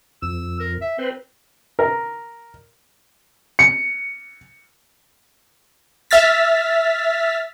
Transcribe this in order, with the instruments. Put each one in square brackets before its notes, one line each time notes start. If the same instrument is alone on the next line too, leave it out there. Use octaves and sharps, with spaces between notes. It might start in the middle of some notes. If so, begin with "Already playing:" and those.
[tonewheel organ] F2 [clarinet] E6
[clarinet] A#4
E5
[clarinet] C4 [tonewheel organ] B4 C5
[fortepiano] A#4
[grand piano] C#7
[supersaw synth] E5 F6 A6 B6